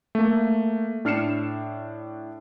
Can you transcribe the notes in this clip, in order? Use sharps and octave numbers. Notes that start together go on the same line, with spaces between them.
A3 A#3
A2 D4 F6 C7 C#7 E7